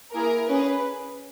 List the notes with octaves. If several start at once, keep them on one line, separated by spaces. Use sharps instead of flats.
A#3 E4 G#4 A#4
C#4 G#4 B4